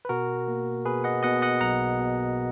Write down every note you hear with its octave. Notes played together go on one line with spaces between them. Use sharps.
B4
B2 F#4 A#4
A#3
B2 G#4 B4
D#5 F#5
B2 D#5 F#5
D#5 F#5
B1 F#5 A#5
B2